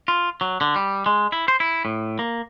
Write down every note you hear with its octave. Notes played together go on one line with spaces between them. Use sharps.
F4
F#3
D3
G3
G#3
E4
C5
E4
A2
A#3